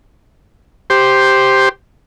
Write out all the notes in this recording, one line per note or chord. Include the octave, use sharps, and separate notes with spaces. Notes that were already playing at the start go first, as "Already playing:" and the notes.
G4 C5